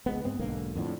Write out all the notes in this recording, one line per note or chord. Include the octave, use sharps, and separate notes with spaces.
C#2 G#3 B3
G#2 B3 C4
B1 G#2 D3 A#3
F2 A2 D3